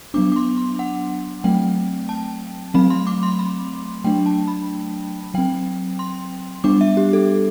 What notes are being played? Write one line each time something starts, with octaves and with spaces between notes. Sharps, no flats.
F#3 B3 D4 D6
D6
C6
C6
F#5
F#3 A3 C4 G5
A5
F#3 A3 C4 B5
C6
D6
C6
B5
F#3 A3 D4 G5
A5
B5
F#3 C4 G5
C6
G3 B3 D4 D6
E5
G4
A4